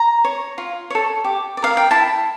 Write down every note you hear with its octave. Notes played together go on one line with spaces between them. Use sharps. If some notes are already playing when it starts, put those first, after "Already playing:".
Already playing: A#5
C#5
F4
A4 C#5
G4
D5
A#4 F5
G5
E4 A5